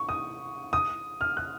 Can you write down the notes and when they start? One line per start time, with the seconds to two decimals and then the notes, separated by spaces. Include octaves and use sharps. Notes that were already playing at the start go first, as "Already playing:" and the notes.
Already playing: C#6
0.09 D#6
0.73 D#6
1.21 F6
1.37 F#6